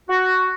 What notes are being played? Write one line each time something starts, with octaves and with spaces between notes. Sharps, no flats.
F#4